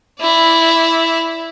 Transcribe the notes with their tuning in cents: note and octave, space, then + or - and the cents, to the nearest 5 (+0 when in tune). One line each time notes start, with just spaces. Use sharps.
E4 +0 D5 -15